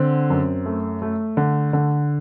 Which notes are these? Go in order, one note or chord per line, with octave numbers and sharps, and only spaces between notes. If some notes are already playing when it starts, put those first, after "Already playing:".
Already playing: D3 C4
F#2
A3
A3
D3
D3